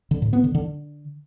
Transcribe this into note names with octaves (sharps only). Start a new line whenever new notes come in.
D3
A2
B3
D3
D3